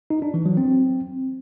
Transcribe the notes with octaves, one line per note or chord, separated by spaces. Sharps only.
D#4
D4
E3
F#3
C4